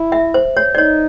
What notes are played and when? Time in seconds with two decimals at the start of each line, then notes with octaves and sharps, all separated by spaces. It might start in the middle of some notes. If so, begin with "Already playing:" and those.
Already playing: E4
0.12 E5
0.34 C5
0.57 C#5
0.75 D5
0.78 D#4 C#5